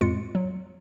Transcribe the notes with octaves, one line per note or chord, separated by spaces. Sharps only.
F2 A2 G#3 F4 C#7
F#3